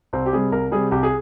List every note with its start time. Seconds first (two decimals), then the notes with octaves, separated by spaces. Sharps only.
0.13 C2 C4
0.26 G4
0.33 C3 G3 G#4
0.52 C2 A#4
0.72 C3 G3 G#4
0.91 C2 G4
1.03 G#4